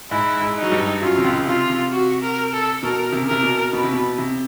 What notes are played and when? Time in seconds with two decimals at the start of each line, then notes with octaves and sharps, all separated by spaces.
0.11 G#2 G#3 E4
0.41 G#2 G#3
0.57 D#4
0.62 F#3
0.72 G2 G3
1.02 F#2 F#3 F4
1.17 C3
1.24 C#2 C#3
1.36 C#3
1.47 C3 F4
1.70 C3
1.92 F#4
2.23 A#4
2.53 A4
2.83 B2 A#4
3.12 C3
3.22 C#3
3.28 C3 A#4
3.43 B2
3.73 B2 B4
3.84 C3
3.93 B2
4.18 C3